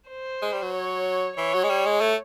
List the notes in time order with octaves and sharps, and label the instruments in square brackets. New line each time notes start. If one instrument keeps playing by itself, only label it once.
[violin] C5
[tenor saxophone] G#3
G3
F#3
[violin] C#5
[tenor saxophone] E3 [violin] C#5
[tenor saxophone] F#3
G#3
G3
G#3
A3